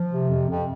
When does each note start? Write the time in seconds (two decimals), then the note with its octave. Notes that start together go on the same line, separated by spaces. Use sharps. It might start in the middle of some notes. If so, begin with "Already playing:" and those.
Already playing: F3
0.10 C3
0.30 F2
0.49 F2